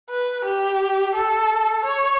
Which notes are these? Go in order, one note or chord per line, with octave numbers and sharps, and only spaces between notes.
B4
G4
A4
C#5